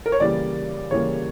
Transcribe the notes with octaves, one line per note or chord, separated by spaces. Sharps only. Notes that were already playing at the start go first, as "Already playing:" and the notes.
A#4
C#5
C#3 E3 G3 A#3 D5
C#3 E3 G3 A#3 C#5